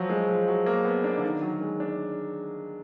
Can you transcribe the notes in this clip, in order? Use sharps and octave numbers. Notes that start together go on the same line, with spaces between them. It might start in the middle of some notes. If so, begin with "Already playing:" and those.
Already playing: F3 F#3
G#3
F3
F#3
A#3
B3
D4
D3
D#3
F#3
G#3
D4